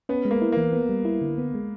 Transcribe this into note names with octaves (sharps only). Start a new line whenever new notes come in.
B3 C#4
G#3
A#3
E4
E3 A#3
B3
G3
E4
D3
B3
G#3